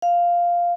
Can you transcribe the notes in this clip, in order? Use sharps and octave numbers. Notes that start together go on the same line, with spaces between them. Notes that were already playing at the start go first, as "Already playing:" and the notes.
F5